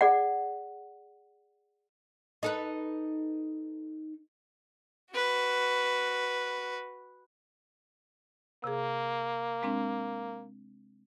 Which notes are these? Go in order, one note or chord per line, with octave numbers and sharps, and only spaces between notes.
G#4 D5 F#5
D#4 A4 B4
F#4 B4
C3 A#3 G#4
G#3 C4 D4